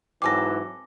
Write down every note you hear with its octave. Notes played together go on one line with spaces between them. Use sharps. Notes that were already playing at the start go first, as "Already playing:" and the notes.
G#2 E3 F#3 C4 G#4 A4 D6 A#6